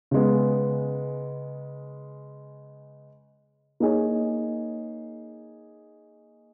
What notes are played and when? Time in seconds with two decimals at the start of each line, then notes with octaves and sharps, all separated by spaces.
0.11 C#3 G#3 B3
3.80 A#3 D#4 G#4 C#5